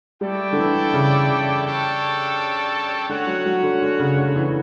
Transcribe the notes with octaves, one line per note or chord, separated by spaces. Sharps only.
G3 A3 E4 A4 D5 G5
D3
E3
C#3
C#3
G3 D4 A4 C#5 G5
D3 C#4 F#4 C#5 F#5
F#3
F#3
D3
D3
C#3
D3
E3